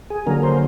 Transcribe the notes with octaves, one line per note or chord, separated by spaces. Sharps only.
G#4
D3 F#3 A#3 A#4
C5